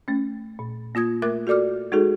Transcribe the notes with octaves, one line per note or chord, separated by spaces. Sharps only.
A3 C#4
A#2
A#3 F4 D#6 G#6
A3 A#4 E5 D6 F#6
F#4 A4 D5 D6 F6
G#3 D#4 F#4 G#4 A4